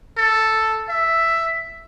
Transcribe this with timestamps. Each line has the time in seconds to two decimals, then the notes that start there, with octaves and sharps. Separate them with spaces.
0.17 A4
0.89 E5